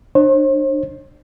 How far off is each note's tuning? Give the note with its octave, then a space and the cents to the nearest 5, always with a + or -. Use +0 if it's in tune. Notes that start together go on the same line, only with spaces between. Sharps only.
D4 +30 C5 +45